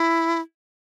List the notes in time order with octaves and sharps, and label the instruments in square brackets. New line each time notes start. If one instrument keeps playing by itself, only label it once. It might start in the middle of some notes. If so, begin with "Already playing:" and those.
Already playing: [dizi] E4